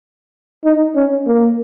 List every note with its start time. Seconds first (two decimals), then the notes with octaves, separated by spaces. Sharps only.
0.65 D#4
0.95 C#4
1.27 A#3